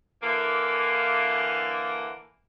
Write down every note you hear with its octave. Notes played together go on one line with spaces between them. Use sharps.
D3 E3 A#3